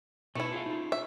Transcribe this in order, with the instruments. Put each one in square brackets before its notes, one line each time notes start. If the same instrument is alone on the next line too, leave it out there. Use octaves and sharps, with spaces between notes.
[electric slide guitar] B2 D#4 B4 [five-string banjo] A3 E4
[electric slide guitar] F4 G#4 F5
D#4 F4
[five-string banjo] E5